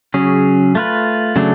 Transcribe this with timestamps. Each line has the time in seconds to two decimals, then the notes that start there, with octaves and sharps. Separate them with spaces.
0.14 C#3 F#3 C#4 G#4
0.75 A3 F4 B4
1.36 C#3 F#3 A3 D4